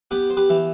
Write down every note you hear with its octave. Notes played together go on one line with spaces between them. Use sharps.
B3 G4 B4
C5
G4 B4
E3